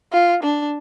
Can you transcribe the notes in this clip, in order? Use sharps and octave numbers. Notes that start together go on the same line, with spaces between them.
F4
D4